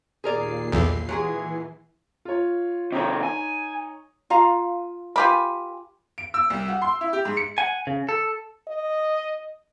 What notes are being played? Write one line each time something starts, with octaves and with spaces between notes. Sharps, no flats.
D#2 A#2 G#4 A#4 D5 C7
B1 E2
E3 F#3 G#3 G#4
F4 C#5
C3 D#3 D#4 C#5
G#5
F4 F5 A#5
F4 G4 A#4 G#5 B5
D7
E6
C2
F#4
C6
E4
G4
G#2
C#7
F#5 G#5
C#3
A4
D#5